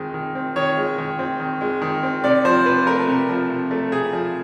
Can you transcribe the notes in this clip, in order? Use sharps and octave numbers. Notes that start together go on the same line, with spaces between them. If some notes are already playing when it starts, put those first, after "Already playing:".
Already playing: D#3 G#3 C4
D#3
C4
D#3 C#5
G#3
D#3
C4
D#3
G#3
D#3
C4
C3 D5
F3 C5
C3 B4
A3 A#4
C3
F3
C3
A3
C3 G#4
F3